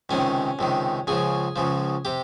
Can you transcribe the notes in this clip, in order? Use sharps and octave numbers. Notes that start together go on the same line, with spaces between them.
C#2 C3 D#3 C#4
C#2 C3 D#3
C#2 C#3 F3 G#4
C#2 C#3 F3
C3 G4